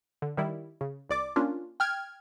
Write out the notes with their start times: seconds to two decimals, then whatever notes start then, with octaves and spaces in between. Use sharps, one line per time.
0.22 D3
0.37 D#3 G3 E4
0.81 C#3
1.09 C2 D5 D6
1.36 A#3 C#4 D4 F4
1.80 G5 F6 G#6